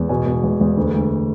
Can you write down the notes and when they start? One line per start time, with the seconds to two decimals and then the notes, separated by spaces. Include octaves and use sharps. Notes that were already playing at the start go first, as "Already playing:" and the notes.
Already playing: E2
0.09 B2 G#5
0.26 B2
0.44 E2
0.61 E2
0.77 D2
0.94 D2